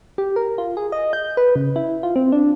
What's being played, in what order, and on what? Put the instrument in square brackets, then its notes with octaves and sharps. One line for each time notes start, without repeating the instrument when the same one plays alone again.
[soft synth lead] G4
A#4
F4
G#4
D#5
G6
B4
C#3
E4
F4
C4
D4